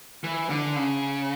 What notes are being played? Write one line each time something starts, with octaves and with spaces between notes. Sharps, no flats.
E3
D3
C#3